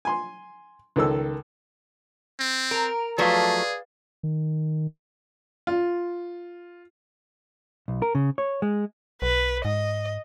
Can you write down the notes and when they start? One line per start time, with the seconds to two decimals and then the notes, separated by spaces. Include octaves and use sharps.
0.05 G#5 C6
0.96 C#2 D#3 A4 E6
2.39 C4
2.71 A#4 A#5 D7
3.18 F3 F#3 A3 G#4 B4 D5 F5
4.23 D#3
5.67 F4
7.88 B1
8.02 A#4
8.15 C#3
8.38 C#5
8.62 G#3
9.22 B1 B4
9.65 G#2 D#5